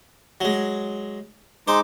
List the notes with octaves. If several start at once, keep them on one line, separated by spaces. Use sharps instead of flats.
F#3 G#3
G#3 D#4 C5 D6